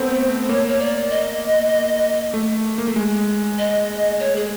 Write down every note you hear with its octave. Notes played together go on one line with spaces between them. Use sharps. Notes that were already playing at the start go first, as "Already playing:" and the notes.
Already playing: A3 B3 C4 C5
C5
A#3 C#5
C#5
D5
D#5
A3
A#3
A3
G#3
D#5
C#5
G#4